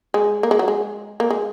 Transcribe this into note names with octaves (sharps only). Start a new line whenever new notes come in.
G#3
A#3
G#3
F#3
G#3
A#3
G#3